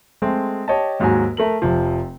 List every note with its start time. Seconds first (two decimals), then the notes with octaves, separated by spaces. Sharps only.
0.22 G#3 A3 C4
0.68 G4 C#5 D#5 A5
1.00 D#2 G#2 F#3 F#4 G#5
1.37 A3 A#4 F#7
1.62 F1 C3 F3